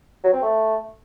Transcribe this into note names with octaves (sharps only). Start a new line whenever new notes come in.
F#3
C4
A3